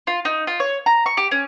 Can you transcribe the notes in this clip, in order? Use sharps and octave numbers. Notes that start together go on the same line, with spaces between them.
F4
D#4
F4
C#5
A#5
C#6
G4
C#4